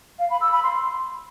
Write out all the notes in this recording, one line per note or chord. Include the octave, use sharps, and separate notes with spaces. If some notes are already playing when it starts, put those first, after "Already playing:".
F5
B5
E6
B5
C6